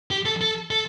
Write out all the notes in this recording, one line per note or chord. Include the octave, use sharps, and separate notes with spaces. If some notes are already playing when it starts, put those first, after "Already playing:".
G4
A4
A4
A4